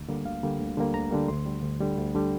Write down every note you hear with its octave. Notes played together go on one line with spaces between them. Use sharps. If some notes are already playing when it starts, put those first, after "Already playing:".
Already playing: D2
D3 G3 A#3
D2 F5
D3 G3 A#3
D2
D3 G3 A#3
D2 A#5
D3 G3 A#3
D2 C6
D3 G3
D2
D3 G3
D2
D3 G3